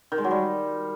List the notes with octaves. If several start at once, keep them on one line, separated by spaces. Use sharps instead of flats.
D#3
G#3
F#3
G3